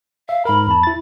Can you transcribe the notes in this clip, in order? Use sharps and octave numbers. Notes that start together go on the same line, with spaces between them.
E5 F5
G#2 A#4 B5
E2 A5
E4 A6